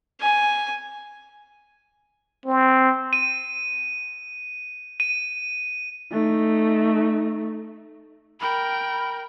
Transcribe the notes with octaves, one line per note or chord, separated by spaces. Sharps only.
G#5
C4
D#7
D#7
A3 D#4
A#4 G5 B5